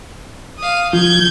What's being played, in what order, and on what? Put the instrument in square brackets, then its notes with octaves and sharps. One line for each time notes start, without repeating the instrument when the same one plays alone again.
[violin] F5 D#6
[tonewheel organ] F3 [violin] G6 G#6